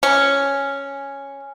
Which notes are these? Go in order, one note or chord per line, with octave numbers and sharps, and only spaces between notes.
C#4